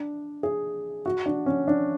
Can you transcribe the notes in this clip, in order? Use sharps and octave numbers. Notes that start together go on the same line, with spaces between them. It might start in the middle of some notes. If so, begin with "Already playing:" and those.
Already playing: D4
G#4
F#4
D4
C#4
D4